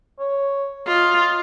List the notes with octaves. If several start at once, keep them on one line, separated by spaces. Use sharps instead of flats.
C#5
F4 D#5